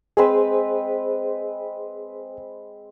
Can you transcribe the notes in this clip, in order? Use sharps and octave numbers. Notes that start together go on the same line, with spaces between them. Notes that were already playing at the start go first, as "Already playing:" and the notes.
G#3 C4 G#4 B4 C5